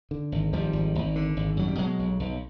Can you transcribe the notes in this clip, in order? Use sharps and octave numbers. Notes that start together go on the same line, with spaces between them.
D3
G#1
G#1 F3 G3
G#1
G#1
D3
G#1
F#2 F#3
G3
B2 F#3 G#3
B1
B1